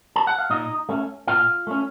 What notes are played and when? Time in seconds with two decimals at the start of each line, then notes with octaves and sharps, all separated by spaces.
0.16 A5
0.27 F#5
0.39 F5
0.50 A#2 D#4 D#5
0.89 A3 C#4
1.27 A#2 F4 F5
1.67 A3 C#4